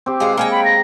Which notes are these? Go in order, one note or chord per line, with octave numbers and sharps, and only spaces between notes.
C4 G4
B2 G#3 G#4 F5
A#3 C#5 G5 G#5 A#5
B5
A#6